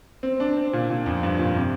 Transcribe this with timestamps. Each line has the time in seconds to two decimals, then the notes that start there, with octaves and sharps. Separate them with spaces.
0.23 C4
0.40 D4
0.57 C4
0.73 A#2
0.90 A#2
1.06 F2
1.23 G2
1.39 A#2
1.57 C3